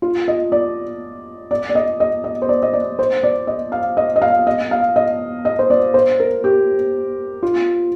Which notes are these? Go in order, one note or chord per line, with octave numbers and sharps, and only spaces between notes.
F4
D#5
D5
D5
D5
D#5
D#5
D#5
C5
D5
D#5
D5
C5
D5
D#5
F5
D#5
D#5
F5
D#5
F5
D#5
D#5
C5
D5
C5
A#4
G4
F4